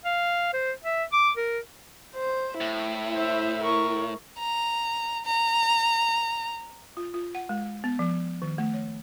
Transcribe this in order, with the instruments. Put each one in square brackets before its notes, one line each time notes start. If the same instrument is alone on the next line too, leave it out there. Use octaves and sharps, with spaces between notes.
[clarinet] F5
C5
E5
D6
A#4
[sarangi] C5
[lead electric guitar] A2 [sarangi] E4
[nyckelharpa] C5 E5
A#4 C#6
[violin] A#5
A#5
[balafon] F4
F4
F#5
G#3
B3
F3
D#3
A3
C#5